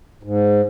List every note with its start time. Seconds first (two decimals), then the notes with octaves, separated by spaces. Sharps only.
0.23 G#2